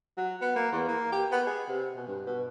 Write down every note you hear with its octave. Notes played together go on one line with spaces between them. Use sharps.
F#3
B3
A#3
E2
A#3
G4
B3
G#4
C3
B2
G2
B2